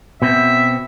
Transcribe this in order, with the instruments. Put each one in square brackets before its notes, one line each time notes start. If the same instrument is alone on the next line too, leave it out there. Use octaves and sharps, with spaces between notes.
[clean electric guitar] B2 B3 C4 [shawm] E5